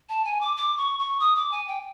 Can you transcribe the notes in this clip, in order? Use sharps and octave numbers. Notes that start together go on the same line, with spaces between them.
A5
G#5
D6
D6
C#6
C#6
D#6
D6
G#5
G5